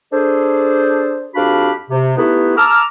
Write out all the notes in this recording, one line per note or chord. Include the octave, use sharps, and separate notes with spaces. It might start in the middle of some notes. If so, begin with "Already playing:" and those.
D4 G#4 A4 C5
F2 D4 F#4 G4 F5 B5
C3
A3 B3 D#4 E4 G4 B4
A5 A#5 D6 E6 F6